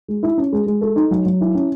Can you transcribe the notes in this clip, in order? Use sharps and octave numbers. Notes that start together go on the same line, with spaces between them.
G#3
E4
C#4
G#3
G#3
A4
D#4
F#3
F#3
E4
C#4